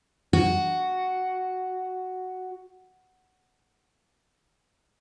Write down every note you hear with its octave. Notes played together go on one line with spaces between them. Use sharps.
F#4